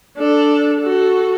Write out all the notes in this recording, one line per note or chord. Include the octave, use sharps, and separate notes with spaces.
D4 A4
F#4 A4